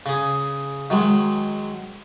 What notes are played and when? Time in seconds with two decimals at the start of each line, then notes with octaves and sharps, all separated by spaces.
0.06 C#3 G#4
0.90 D#3 F#3 G#3